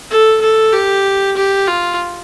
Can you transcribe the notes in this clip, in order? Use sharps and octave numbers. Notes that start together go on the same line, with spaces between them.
A4
A4
G4
G4
F4